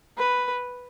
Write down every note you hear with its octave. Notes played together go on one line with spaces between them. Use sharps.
B4